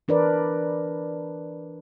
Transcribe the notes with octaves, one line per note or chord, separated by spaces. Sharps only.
E3 D4 A#4 B4 D5